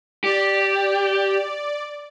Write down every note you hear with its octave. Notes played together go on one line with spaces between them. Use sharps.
G4 D5